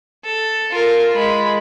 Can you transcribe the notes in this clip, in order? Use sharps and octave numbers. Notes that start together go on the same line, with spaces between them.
A4
F4 A#4
G#3 B5